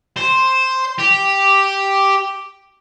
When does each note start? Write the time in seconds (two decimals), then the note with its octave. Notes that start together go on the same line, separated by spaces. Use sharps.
0.17 C5
0.99 G4